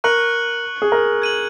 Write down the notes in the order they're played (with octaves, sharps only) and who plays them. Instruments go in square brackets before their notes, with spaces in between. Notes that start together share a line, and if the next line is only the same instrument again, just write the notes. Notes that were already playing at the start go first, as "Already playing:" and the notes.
[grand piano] A#4 [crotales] C#6 F#6 C#7 F#7
[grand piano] G#4
A#4
[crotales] G#6 D#7 F#7